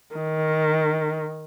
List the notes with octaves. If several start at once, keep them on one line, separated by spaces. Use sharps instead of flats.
D#3